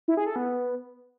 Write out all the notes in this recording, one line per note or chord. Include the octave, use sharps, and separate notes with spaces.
E4
G#4
A4
B3